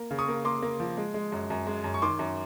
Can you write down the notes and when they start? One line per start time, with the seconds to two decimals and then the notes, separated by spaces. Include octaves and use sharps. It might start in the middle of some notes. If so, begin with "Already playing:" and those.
Already playing: A#3
0.11 C#3
0.18 C#6 D#6
0.28 A#3
0.45 A#3 C6 D6
0.62 A#3
0.80 F3
0.97 G#3
1.14 G#3
1.32 F#2
1.50 F#2
1.67 G#3
1.84 F#2
1.94 C#6
2.02 D#3 C6 D6
2.19 F#2